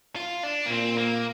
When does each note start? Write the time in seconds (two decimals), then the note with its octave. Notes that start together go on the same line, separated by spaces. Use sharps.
0.16 F4
0.43 D4
0.66 A#3
0.70 A#2 C4
0.98 A#3